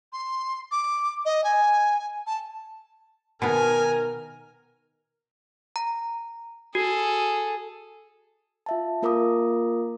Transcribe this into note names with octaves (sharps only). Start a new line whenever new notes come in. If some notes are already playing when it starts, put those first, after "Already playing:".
C6
D6
D#5
G#5
A5
B2 D#3 B3 A#4 G#5
A#5
F#4 G#4 A4
F4 E5 A5
A#3 F4 A#4 A#5 D6 D#6